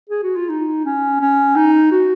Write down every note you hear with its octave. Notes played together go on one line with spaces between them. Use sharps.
G#4
F#4
F4
D#4
C#4
C#4
D#4
F#4